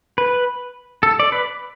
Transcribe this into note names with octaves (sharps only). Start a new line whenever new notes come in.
B4
A4
D5
B4